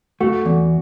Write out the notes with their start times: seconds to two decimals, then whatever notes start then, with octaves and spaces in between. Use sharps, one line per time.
0.20 A3 F#4
0.45 E2